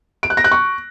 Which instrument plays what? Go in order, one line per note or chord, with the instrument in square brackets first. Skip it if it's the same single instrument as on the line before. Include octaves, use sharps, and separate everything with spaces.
[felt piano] D7
F#6
A#6
F#6
C#6